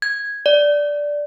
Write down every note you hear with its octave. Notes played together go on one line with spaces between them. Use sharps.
G#6
D5